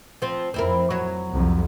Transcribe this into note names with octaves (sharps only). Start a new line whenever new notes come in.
F3 C4
F2 C4 E4 A#4
F#3 C#5
C2 F2